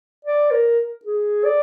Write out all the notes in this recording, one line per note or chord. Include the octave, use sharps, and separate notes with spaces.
D5
A#4
G#4
D5